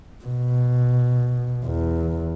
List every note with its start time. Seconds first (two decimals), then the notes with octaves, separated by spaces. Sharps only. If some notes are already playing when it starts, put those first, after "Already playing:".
0.25 B2
1.66 E2